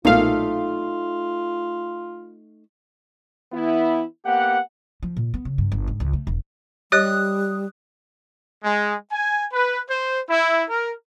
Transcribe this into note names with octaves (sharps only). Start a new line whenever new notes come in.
B1 A#2 A3 D#4 F4 F5
E3 B3 E4
A#3 B3 G4 F#5
F3
A#2
B3
C#3
G2
G1
G#2
C#2
A3
E1
G3 G4 C#5 D#5 D#6 F#6
G#3
G#5
B4
C5
E4
A#4